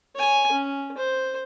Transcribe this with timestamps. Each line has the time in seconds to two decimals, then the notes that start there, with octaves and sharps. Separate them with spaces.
0.15 C#5 G#5
0.52 C#4
0.97 C5